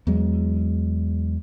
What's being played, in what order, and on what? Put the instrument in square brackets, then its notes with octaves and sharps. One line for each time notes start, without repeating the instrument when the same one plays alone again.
[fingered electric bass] E2 F#3 G#3